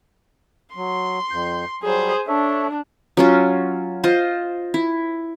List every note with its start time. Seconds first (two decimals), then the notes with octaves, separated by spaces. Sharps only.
0.76 F#3 C6
1.31 F2 G6
1.83 F#3 G3 G#4 C5
2.28 D4 A4 C#5 E5
3.17 F#3 C#4 F4
4.04 F4 C5 D#5
4.74 E4